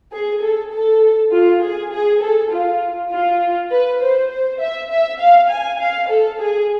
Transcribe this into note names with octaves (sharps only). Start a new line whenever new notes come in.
G#4
A4
A4
F4
G#4
G#4
A4
F4
F4
B4
C5
C5
E5
E5
F5
G#5
F5
A4
G#4